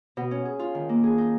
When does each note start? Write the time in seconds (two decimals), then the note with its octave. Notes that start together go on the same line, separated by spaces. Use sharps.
0.17 B2
0.31 C#4
0.45 G#4
0.59 F4
0.75 D#3
0.89 A#3
1.03 G#4
1.18 D#4